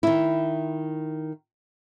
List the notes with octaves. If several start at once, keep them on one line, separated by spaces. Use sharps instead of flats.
D#3 E4